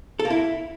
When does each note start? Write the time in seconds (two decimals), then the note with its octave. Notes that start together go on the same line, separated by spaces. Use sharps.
0.20 A4
0.25 A#3
0.30 E4